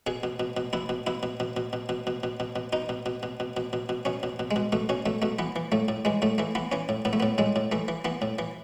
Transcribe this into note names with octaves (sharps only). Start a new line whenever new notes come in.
B2 G#4
B2
B2
B2
B2 E4
B2
B2 E4
B2
B2
B2
B2
B2
B2
B2
B2
B2
B2 D#4
B2
B2
B2
B2
B2
B2
B2
B2 C#4
B2
B2
G#3
B2
B2 A3
B2 C#4
B2 A3
B2 A3
E3 B3
E3
A2 A3
A2
E3 G#3
A2 A3
E3 A3
E3 B3
E3 C#4
A2
A2 B3
A3
A2 B3
A2 G#3
A2
E3 A3
E3
E3 B3
A2
E3